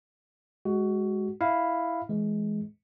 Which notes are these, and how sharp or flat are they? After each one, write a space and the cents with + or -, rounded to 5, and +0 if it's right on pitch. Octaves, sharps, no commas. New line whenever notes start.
G#3 +0 F#4 +15
E4 +0 F5 +0
E3 +0 G#3 +15